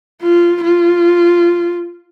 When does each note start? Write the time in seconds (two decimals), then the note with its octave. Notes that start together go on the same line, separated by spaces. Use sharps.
0.23 F4
0.64 F4